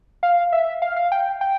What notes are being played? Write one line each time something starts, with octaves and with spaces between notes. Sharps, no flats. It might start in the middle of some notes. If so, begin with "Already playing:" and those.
F5
E5
F5
F5
G5
G5